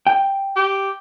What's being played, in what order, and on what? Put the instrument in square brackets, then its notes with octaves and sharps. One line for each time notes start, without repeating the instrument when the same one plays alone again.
[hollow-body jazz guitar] G5
[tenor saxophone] G4